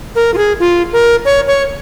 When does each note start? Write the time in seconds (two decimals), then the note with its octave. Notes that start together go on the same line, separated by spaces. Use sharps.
0.16 A#4
0.34 F4
0.38 G#4
0.60 F4
0.93 A#4
1.25 C#5
1.47 C#5